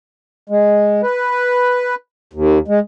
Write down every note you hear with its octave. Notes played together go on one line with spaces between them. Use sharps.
G#3
B4
D#2
G#3